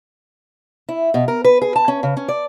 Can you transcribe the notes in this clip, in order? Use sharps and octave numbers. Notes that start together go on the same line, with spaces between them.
E4
B2
A#4
B4
G#4
A5
C#4
C#3
C#4
D5